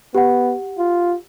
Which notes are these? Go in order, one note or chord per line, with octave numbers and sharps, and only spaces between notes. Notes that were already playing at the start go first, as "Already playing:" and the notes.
B3 G4 F#5
F4